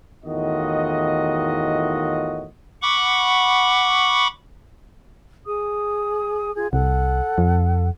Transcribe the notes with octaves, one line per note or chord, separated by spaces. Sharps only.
E2 A2 D#3 F4 F#4 D#5
F#5 B5 C#6 D6
G#4 D#6
F4 G#4 G#6
C2 A4 F#5
F2